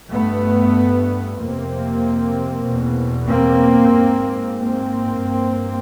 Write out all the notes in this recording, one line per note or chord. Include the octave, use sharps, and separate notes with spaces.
G2 A3 B3
F2 C3 A#3 C4
E2 B2
A#3 C4
G#2
A#3 C4
G2